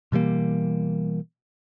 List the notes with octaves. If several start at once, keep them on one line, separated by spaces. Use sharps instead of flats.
B2 E3 G3 A#3